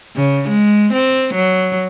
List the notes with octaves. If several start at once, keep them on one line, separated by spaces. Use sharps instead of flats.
C#3
G#3
C4
F#3